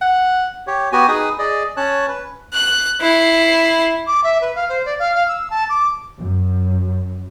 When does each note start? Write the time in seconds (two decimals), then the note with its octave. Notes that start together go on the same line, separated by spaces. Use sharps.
0.01 F#5
0.67 G4 C#5
0.92 B3 F#4 G4 G#5
1.08 D#4 G#4 B4 G#5 D#6
1.39 G#4 D5 D#5
1.77 C#4 C#5 A5 F#6
2.08 B4
2.54 F#6
3.01 E4 C7
4.07 D6
4.24 E5
4.41 B4
4.55 F5
4.69 C5
4.86 D5
4.99 F5
5.15 F5
5.28 E6
5.50 A5
5.69 D6
6.19 F#2